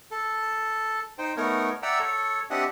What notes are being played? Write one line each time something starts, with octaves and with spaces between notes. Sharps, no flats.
A4
D#4 C5 G5
A3 B3 D#4 A#4 C#5
D5 E5 F#5 G5 A#5 E6
A4 C#5
C4 D4 G4 D#5 E5 F#5